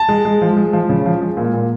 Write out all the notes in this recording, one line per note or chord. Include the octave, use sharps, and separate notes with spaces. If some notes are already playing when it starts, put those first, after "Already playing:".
Already playing: A5
G#3
G#3
F3
G#3
F3
C#3
F3
G#3
A#2
A#2